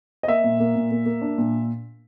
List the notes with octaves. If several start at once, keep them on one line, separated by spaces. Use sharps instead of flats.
D#5
A#3 E5
A#2
A#3
A#2
A#3
A#3
D4
A#2